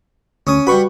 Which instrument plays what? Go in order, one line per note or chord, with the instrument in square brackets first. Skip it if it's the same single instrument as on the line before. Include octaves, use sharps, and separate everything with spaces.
[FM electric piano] D2 [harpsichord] C#4 D#6
[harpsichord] G3 B5 [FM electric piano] F#4 B4 C#6